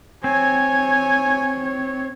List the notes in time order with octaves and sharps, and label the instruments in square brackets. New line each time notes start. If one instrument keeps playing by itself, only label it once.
[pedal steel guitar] C4 [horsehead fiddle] C#5 [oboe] G#5